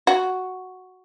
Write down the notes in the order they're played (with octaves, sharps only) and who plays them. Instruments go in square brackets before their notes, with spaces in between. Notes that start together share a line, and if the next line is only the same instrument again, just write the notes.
[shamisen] F#4